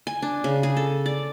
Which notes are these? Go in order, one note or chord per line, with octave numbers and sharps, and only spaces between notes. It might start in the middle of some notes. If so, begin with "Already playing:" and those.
G#5
D4
C#3
G#4
A4
D5